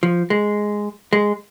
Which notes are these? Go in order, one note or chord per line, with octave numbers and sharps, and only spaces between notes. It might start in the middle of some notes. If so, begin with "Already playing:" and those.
F3
G#3
G#3